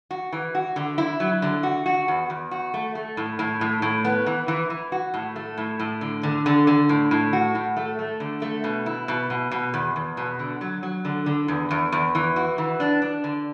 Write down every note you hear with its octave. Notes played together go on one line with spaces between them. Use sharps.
F#4
E3
F#4
D3
E4
F#3
D3
F#4
F#4
E2
E2
F#4
A3
A3
A2
A2
A2
A2
B3
E3
E3
E3
F#4
A2
A3
A2
A2
D3
D3
D3
D3
A2
A2
F#4
A2
A3
A3
D3
A3
B2
E4
B2
B2
B2
E2
E2
B2
D3
F#3
F#3
D3
D3
E2
E2
E2
E3
F#4
E3
D4
D4
D3